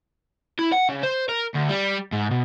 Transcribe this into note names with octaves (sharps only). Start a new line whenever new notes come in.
E4
F#5
C#3
C5
A#4
D2
G3
G#2
B2